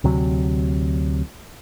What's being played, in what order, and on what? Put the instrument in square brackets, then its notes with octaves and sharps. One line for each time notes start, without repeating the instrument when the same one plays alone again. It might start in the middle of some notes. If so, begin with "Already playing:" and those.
[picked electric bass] D2 C3 F#3